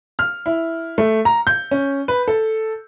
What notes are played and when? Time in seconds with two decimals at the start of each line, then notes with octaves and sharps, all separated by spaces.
0.19 F6
0.46 E4
0.98 A3
1.25 A#5
1.47 G6
1.71 C#4
2.08 B4
2.28 A4